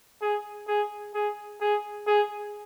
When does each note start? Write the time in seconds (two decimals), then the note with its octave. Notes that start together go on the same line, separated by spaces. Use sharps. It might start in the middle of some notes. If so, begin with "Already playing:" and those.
0.22 G#4
0.68 G#4
1.15 G#4
1.61 G#4
2.07 G#4